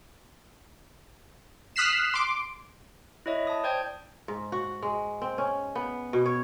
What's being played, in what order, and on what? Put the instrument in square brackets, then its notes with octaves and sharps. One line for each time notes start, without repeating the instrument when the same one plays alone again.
[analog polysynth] D#6 F6 F#6 B6 C7 E7
C6 D6
[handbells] E4 C#5 D#5 E5
A5 D#6
C5 D5 G5 G6 G#6
[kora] G#2
F#4
G#3
C4
C#4
B3
B2
C#5